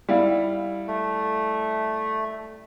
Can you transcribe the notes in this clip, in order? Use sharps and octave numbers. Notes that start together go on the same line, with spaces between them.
G3 E4 F5
A3